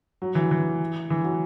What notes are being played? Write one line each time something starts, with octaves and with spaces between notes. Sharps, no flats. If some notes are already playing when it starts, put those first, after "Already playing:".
F#3
E3
E3
E3
F#3